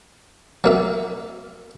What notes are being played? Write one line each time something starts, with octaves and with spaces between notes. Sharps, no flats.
F#3 A#3 E5